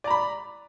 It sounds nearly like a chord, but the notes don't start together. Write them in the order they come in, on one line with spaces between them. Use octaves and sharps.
D5 A#5 B5